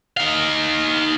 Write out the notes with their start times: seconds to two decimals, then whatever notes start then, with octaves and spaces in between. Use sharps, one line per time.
0.17 D#4 F5